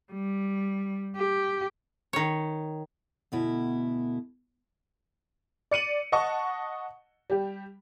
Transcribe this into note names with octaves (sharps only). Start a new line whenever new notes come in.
G3
G4
D#3 C#5
D2 B2 E4
D5 C#7 D#7 F#7
D#5 F#5 A5 C#6
G3 G4